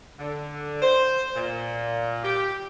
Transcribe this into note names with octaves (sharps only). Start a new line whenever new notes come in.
D3
C5
A#2
G4